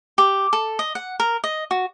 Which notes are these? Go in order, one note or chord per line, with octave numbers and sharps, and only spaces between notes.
G4
A4
D#5
F#5
A#4
D#5
F#4